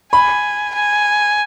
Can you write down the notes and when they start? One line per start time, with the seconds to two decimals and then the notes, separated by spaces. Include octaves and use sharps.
0.13 G#5 B5
0.74 G#5